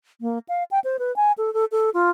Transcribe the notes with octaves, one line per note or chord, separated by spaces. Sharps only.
A#3
F5
G5
C5
B4
G#5
A4
A4
A4
F4